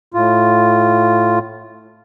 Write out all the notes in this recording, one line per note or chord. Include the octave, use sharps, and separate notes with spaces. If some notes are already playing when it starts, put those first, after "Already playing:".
A2 F4